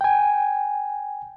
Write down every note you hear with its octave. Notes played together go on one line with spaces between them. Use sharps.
G5 G#5